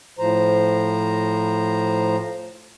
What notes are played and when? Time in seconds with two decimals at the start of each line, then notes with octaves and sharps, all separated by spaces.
0.19 A2 F3 C5 A#5